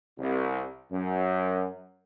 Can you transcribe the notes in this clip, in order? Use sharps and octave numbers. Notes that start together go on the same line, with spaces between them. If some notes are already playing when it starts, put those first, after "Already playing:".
C2
F#2